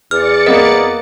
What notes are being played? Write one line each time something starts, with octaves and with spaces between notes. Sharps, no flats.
E2 D5 F6 A6 C#7
A#3 B3 A#4 D#5